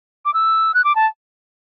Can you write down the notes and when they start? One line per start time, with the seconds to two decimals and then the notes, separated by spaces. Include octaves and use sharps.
0.25 D6
0.34 E6
0.74 F#6
0.84 D6
0.96 A5